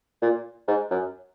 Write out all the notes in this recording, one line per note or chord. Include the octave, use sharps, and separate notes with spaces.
A#2
G#2
F#2